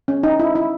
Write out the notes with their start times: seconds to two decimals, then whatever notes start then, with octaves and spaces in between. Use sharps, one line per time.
0.08 C#4
0.23 D#4
0.40 E4
0.55 E4